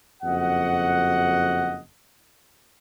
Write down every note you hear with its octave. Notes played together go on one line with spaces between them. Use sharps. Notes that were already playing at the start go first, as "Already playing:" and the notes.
F#1 F2 F#4 D#5 F#5